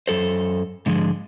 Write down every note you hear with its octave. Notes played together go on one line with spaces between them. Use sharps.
F#2 A4 C5
G#2 D3 F3 G#3